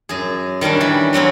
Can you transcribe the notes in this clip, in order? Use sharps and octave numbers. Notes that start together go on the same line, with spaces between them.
F#2 G#4
D#3 G3 C#4 D4
E3
E3 F#3 C4 C#4